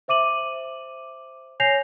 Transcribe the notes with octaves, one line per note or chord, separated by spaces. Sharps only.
C5 E5 D6 D#7 F#7
C#5 G#5 G6 A#6 C7 F7